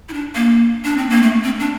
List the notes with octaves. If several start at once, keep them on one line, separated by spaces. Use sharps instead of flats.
E4
D4
A#3
D4
C4
A#3
A3
C4
D4